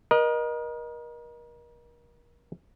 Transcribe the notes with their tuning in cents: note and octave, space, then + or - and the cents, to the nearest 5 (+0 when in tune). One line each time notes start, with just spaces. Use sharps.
A#4 +35 D#5 -15